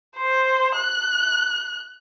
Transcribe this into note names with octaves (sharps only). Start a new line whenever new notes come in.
C5
F#6